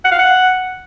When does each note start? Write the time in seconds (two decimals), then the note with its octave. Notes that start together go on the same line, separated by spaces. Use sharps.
0.05 F#5
0.12 F5
0.19 F#5